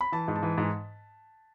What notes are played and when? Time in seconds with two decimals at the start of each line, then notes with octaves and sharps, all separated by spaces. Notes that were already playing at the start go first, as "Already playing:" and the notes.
0.01 B5
0.12 E3 A5
0.28 G#2
0.36 A5
0.43 E3
0.58 G#2